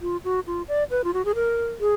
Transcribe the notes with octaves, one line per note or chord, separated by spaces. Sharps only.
F4
F#4
F4
D5
B4
F4
F#4
G#4
A#4
G#4